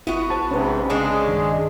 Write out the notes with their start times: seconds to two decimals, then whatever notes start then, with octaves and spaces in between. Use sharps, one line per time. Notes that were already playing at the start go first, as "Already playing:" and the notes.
0.07 G1 B3 E4 F#4
0.30 A#1 C5 A5
0.51 G#2 C3 C#4 B4
0.90 C#3 G#3 D4 C#5
1.28 G2 D#3